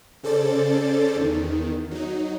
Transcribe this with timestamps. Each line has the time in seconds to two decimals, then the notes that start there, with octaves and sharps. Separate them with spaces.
0.23 C#3 C#4 A4 C5 D5 A6
1.16 E2 D#3
1.91 F#3 D#4